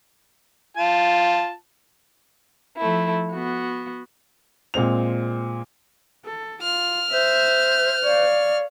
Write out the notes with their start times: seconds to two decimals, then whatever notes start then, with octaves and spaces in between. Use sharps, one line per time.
0.77 F4 A5
2.78 F3 A3 E4
3.31 B3 F#4
4.74 A#2 G#3 C4 F7
6.25 A4
6.62 F4 F6
7.11 C5 E5
8.04 C#5 D5 F5